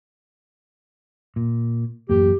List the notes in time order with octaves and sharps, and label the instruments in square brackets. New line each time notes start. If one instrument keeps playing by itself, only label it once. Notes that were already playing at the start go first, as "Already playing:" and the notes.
[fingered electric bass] A#2
[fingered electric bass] A1 F#2 A#3 [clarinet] G4